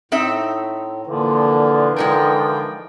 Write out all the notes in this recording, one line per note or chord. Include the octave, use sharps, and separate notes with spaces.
A2 C4 D#4 E5
A#2 D3 E3 F3
D3 G#3 D#4 A#4 G5